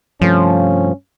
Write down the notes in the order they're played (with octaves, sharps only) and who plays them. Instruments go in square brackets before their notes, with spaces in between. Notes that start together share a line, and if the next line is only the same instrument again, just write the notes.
[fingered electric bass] G2 C3 A3 [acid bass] F3 [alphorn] C#4